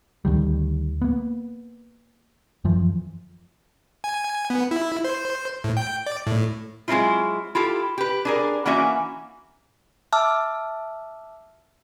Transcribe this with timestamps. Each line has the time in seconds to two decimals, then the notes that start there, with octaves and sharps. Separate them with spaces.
0.25 D2 D#3 G3
1.02 A#3 B3
2.65 F#2 E3 F3
4.04 G#5
4.50 B3
4.71 E4
5.04 C5
5.64 A2
5.77 G5
6.06 D5
6.27 A2
6.88 F#3 G#3 A#3 C4 E4 F4
7.55 E4 F4 G4 A4
7.98 G4 B4
8.25 D4 G#4 A#4
8.66 E3 A#3 C#4 F#4 E5
10.12 E5 A5 D6 E6 F6